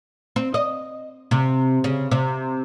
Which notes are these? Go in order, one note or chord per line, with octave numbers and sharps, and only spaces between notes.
C4
D#5
C3
C#3
C3